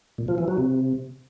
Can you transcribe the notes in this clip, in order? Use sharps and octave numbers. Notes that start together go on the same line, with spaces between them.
A#2
F3
E3
F#3
C3